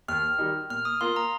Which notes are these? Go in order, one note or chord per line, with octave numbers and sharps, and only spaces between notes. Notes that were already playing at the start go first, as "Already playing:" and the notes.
D#2 F6
D#3 G3 D#4
A#2 F6
D#6
A#3 F4 C6
A#5